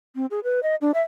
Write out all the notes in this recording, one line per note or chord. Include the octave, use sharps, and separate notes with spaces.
C4
G#4
B4
D#5
D4
E5